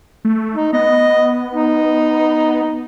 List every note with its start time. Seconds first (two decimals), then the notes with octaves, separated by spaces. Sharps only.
0.25 A3
0.55 D#4
0.73 B3 D#5
1.54 D#4